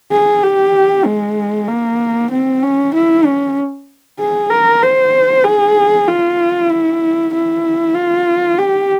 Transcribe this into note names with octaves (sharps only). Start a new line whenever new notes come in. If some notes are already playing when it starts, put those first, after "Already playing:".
G#4
G4
G#3
A#3
C4
C#4
E4
C#4
G#4
A#4
C5
G#4
F4
E4
E4
F4
G4